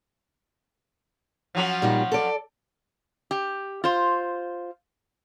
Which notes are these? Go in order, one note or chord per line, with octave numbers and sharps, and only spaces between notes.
F3 F#3 C#4
A#2 G3 D#4
A4 D5
G4
F4 C5